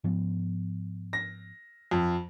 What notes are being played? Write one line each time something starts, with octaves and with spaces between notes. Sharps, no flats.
G#2 F3 B3
A#6
F2